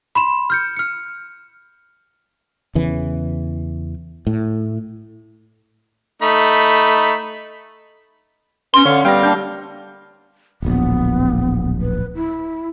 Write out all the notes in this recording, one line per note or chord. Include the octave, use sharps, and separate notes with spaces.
B5 C6 E7
F6 G6 C#7
F6 C#7
E2 C#3 E3
A2
A3 D#4 B5
B3 C#4 C6
D3 C#4 F5 C#6
G3 B3 C4 F5 G5 A#6
A#3 D4 G6
D1 A#1 B3
B4
E4